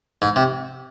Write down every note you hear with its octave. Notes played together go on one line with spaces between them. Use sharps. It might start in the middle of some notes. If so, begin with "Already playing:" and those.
G#2
C3